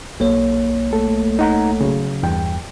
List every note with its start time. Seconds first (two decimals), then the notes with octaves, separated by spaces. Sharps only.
0.20 B1 A#3 C#5
0.93 A3 A4
1.39 D#4 F#5 A#5
1.81 C#3 F#3
2.23 E2 G2 G5